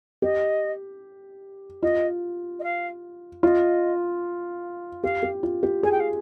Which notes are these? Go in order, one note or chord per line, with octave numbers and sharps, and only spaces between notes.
G4 D#5
F4 D#5
D#5
F5
F4 D#5
G4 F5
G4
F4
G4
G#4 G#5
G5
F5